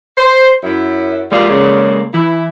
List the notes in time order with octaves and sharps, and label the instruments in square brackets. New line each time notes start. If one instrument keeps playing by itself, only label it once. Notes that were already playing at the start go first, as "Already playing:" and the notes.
[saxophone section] C5
F#2 E4
[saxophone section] G3 F4 [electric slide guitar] G#3 A#3 D5
[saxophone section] C#3
[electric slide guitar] E3 [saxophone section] E4